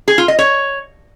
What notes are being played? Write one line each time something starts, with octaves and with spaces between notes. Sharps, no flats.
G#4
F4
D#5
C#5